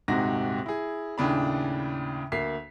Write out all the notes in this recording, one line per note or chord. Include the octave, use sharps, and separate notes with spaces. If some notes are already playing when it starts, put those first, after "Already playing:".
D#1 G#2 C3 F#4 A#6
E4 G#4
D#2 A2 C#3 D4 B5
D2 A#3 B6 C7